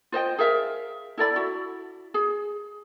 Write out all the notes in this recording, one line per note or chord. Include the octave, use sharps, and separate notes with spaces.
F4 C5 D#5 G5
G#4 A#4 E5 F5
E4 A4 D5 B5
E4 F#4
G#4